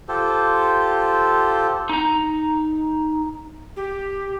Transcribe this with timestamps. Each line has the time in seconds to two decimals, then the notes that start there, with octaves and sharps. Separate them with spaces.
0.09 F4 G4 A4 C5
1.89 D#4 A#5
3.76 G4